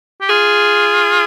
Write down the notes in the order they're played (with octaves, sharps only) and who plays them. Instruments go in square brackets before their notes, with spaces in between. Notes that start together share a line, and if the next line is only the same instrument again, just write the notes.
[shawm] G4
[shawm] F4 [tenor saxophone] G#4